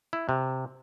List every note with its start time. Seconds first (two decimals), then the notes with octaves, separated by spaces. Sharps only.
0.13 E4
0.29 C3